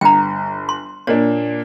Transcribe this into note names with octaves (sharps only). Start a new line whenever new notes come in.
G1 G5 A#5
C6
A#2 A#3 D4 C#5